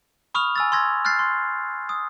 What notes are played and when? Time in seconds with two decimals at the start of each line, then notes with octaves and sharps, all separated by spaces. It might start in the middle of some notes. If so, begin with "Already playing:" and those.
0.34 B5 C#6 D#6 F6 F7
0.56 G#5 E6 A6
0.72 C6 E6 G#6 A#6
1.05 F6 F#6 A6 C7
1.19 C6
1.89 D#6